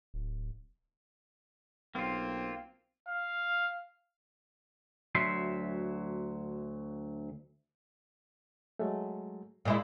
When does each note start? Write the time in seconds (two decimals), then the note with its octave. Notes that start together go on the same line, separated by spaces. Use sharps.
0.14 D1
1.95 B1 A#3 C4 F4
3.08 F5
5.15 D2 F#3 E5 C6
8.79 F#3 G#3 A3
9.65 A#2 G#3 E4